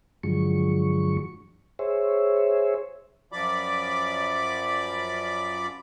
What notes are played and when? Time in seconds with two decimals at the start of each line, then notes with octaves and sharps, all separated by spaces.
0.23 G2 D3 F3 F#3 G#3 C#6
1.79 G#4 C5 C#5 E5
3.32 F#2 F3 D5 B5 D6